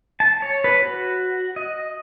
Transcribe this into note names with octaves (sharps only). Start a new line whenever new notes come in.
A5
C#5
B4
F#4
D#5